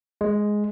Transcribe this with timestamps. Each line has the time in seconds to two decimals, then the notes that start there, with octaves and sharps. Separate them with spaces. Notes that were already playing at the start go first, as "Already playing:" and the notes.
0.21 G#3